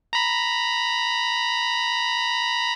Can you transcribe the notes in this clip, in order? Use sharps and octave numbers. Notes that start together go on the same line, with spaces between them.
A#5 B5